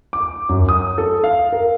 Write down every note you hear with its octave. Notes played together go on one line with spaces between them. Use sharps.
D6
F#2
D#6
A4
F5
A#4